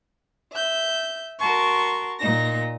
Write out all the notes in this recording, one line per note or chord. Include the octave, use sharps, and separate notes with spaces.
E5 G6
F#4 A#4 A5 C6 C#6
A#2 D#4 A#6